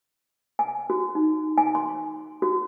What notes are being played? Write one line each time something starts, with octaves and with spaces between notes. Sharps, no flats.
G#5
F#4
D#4
G#5
C6
F#4